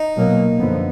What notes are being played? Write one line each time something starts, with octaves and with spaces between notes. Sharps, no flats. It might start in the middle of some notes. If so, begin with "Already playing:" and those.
Already playing: D#4
B2 F#3 A#3
F#2 D3 F3 B3